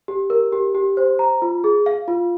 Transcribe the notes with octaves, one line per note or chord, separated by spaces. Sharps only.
G4
A#4
G4
G4
C5
A#5
F4
G#4
F5
F4